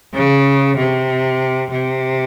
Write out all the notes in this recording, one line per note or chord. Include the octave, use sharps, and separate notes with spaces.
C#3
C3
C3